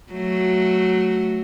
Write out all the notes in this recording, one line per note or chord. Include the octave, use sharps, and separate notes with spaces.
F#3 A3